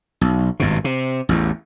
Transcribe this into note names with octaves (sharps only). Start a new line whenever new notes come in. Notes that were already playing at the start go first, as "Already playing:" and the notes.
B1
G#1 G2 B2
C3
A1 E2